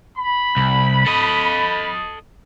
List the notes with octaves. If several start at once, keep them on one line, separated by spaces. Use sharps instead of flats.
B5
C2
A4 D#5